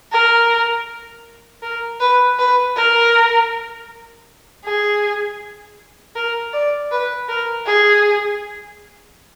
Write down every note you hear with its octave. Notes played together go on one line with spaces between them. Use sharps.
A#4
A#4
B4
B4
A#4
G#4
A#4
D5
B4
A#4
G#4